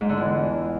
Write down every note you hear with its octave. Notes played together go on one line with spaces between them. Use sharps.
G#2
D3
E2